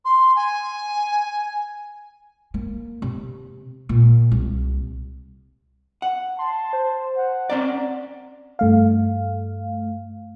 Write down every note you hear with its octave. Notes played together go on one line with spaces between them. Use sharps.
C6
G#5
A#3
C3
A#2
C2
F#5
A5 C6
C5
F#5
C4 C#4 D5 F#5 A#5
G2 A3 F5